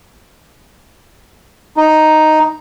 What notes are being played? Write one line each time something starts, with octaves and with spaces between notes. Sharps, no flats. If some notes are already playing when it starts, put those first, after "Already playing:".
D#4